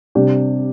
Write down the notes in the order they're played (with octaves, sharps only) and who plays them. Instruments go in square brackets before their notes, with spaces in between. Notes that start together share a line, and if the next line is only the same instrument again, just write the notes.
[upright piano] C3 G3 D4 G4